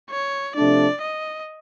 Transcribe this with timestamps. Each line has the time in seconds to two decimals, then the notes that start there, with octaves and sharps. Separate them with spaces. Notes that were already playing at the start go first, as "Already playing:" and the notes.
0.10 C#5
0.55 C3 F3 A3 D4 D5
1.01 D#5